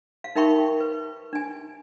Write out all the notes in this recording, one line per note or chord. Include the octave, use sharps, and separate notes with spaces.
F5
D#4 A#4 E5 G5 B5 C#6
B4
D4 G#5